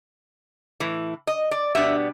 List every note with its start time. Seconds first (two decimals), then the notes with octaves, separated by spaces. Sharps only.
0.80 A2 E3
1.27 D#5
1.51 D5
1.75 B2 G3 B3 D4 E5